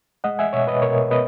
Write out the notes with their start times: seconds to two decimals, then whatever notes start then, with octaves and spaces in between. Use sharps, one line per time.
0.24 G#3 D#5 F#5
0.39 E5 G#5
0.53 B2 C#5 E5
0.67 B4 D#5
0.82 B2 A#4 C#5
1.11 B3 B4 D#5